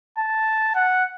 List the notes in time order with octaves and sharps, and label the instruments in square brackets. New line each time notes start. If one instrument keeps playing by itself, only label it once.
[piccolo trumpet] A5
F#5